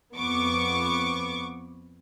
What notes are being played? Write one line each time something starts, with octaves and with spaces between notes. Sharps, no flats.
F2 B3 C#6 D6